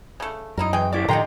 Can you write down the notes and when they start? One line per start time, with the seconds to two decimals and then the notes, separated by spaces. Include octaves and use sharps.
0.20 C#3 A3
0.57 F#2 D#4 E4 A#4
0.73 E3 G#3 G#4 G5
0.92 D2 E4 G4 D5
1.08 A2 D3 F3 D#4 G4 G5 A#5 C6